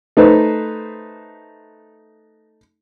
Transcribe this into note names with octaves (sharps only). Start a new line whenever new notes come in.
A3 D#4 B4 C5